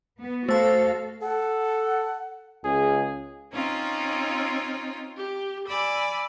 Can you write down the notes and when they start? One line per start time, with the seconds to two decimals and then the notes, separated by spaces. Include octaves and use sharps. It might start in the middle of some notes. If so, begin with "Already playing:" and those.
0.19 B3
0.49 A3 F#4 A4 C5 F5 A5
1.22 A4 F#5
2.65 C#2 G#4
3.53 C4 C#4 D#4 F4
5.17 G4
5.67 D5 G#5 B5 E6